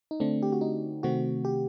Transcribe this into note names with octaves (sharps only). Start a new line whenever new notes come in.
D#4
D3 A3 C4 D4
G4
F#4
D#4
C3 D#3 A3 C4 F#4
G4